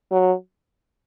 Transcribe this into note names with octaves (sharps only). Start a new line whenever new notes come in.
F#3